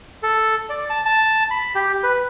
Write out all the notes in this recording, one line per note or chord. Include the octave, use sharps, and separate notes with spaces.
A4
D5
A5
A5
B5
G4
B4